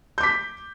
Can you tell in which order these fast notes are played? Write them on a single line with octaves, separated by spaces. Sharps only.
G6 D6 B6